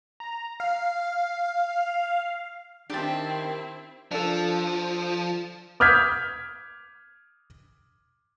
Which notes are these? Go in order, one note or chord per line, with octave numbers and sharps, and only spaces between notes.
A#5
F5
D#3 C4 D4 E4 G4 G5 A5
F3 D4 A4
D6 D#6 F6 G6 G#6 B6